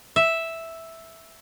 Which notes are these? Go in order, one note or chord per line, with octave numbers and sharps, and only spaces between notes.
E5